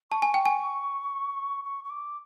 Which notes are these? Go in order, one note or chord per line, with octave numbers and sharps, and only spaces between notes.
A5 C#6
G#5
G5
G#5
C#6
C#6
D6